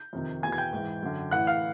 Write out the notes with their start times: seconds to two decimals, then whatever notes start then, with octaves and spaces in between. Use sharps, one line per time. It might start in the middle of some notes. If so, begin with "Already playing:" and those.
Already playing: G6
0.13 F2 C3 D#3
0.42 E2 B2 G#5 G#6
0.52 G#6
0.58 G5 G6
0.73 G#2 E3
1.03 F#2 D3
1.31 A2 E3 F#5 F#6
1.47 F5 F6